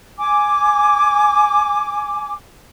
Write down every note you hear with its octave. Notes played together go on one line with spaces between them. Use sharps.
G#5 D6